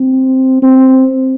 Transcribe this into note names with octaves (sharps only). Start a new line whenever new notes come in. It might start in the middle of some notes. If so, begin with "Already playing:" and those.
Already playing: C4
C4